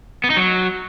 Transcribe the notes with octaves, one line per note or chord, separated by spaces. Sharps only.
B3
D#4
F#3